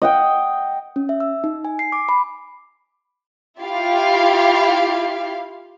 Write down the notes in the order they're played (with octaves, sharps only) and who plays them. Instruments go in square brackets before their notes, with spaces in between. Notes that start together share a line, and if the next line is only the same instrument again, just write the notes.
[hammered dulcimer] D#5 F#5 G5
[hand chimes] C#4
E5
E6
D#4
G#5
C7
D6
B5
[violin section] E4 F4 G4 F5